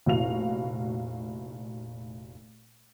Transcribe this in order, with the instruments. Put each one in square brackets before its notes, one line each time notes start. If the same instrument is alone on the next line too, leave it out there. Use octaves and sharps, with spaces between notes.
[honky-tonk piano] F1 A#2 E4 F#4 F5 F7